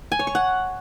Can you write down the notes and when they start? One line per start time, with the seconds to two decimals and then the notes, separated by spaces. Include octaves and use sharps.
0.12 G#5
0.19 C#5
0.27 C#6
0.35 F#5